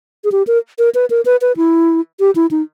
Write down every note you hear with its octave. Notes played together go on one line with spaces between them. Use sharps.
G#4
G4
A#4
A#4
B4
A#4
B4
B4
E4
G4
E4
D#4